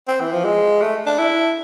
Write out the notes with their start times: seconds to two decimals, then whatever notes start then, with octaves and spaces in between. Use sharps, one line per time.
0.08 C4
0.21 E3
0.33 F3
0.45 G#3
0.81 A3
1.06 D4
1.18 E4